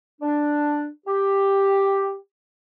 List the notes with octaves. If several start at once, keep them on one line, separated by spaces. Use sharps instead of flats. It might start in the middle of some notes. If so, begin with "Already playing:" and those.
D4
G4